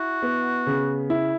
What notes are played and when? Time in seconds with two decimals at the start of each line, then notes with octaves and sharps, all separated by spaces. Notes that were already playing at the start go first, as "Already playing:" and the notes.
Already playing: E4 F#4
0.23 B3
0.67 C#3
1.10 E4